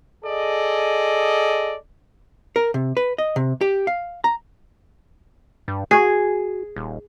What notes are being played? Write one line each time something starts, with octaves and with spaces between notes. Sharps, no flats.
G#4 A4 D5 D#5
A#4
C3
B4
D#5
C3
G4
F5
A#5
G2
F#4 G#4
D#1